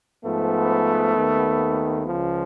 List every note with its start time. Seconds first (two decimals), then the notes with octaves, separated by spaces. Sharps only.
0.25 G#2 F3 A3 B3
1.16 D#2 D#3
2.06 C#2 C#3 F3